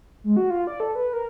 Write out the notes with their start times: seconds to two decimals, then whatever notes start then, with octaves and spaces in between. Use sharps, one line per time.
0.24 G#3
0.37 F#4
0.50 F4
0.67 D5
0.80 A4
0.95 B4
1.13 A#4